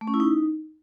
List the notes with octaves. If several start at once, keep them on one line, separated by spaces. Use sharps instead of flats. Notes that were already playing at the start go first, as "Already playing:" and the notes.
A3
C#4
E4
D#4